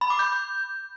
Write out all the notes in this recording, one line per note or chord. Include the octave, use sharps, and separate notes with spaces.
B5
D6
G6